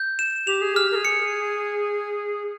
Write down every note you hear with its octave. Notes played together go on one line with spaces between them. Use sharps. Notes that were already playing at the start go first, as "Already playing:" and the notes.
Already playing: G6
E7
G4 F7
G#4
G4 F6
A#4
G#4
C#7